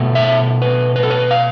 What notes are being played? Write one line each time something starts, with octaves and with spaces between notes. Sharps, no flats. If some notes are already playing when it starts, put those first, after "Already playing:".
Already playing: B2 A3
E5
B4
B4
A4
B4
F5